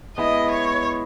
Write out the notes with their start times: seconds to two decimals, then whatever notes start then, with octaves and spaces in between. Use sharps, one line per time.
0.17 G#3 B3 E4 D#5
0.51 C#5